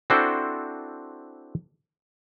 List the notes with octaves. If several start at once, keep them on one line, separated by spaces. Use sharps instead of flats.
C4 D4 E4 F#4 A4 C5